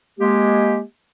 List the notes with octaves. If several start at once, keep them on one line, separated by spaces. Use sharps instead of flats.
G#3 A#3 G4